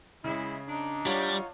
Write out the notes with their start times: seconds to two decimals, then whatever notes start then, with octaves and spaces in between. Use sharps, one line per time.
0.24 C#3 G#3 E4
0.69 D4 D#4
1.06 G3 F4 C#5 F#5